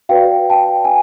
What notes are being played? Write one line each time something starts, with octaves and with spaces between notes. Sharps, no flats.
F#4 B4 D5 F5 G5
G5 A5
G#5